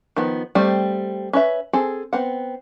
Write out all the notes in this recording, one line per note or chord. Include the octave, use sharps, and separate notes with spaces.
D#3 F3 B3
G3 A3 C4 C5
C#4 B4 E5
C4 G#4 A4
B3 C4 F#5